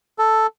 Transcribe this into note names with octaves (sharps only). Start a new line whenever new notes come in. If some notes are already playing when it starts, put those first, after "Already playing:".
A4